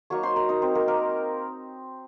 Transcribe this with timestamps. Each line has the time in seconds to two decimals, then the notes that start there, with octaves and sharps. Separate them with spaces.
0.10 F#3 A#3 D#4 C#5 C#6
0.23 C5 C6
0.36 A#4 A#5
0.49 D#4 D#5
0.62 C4 C5
0.75 A#3 A#4
0.88 A#3 A#4